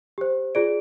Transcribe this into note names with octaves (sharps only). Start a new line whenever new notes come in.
G4 C5
F4 G#4 D5 D7